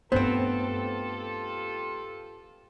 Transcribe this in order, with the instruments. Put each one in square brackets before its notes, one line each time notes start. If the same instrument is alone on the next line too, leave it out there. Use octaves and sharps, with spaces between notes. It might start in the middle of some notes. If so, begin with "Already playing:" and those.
[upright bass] G2 A3 [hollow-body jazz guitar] B3 C4 [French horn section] F4 G4 A4 [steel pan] C5